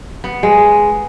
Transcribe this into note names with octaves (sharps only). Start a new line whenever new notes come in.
B3
G#3